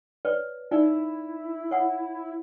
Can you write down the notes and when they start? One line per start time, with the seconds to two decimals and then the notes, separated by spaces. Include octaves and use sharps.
0.25 B4 C#5 D5
0.71 D#4 E4 D5
1.71 C#5 F#5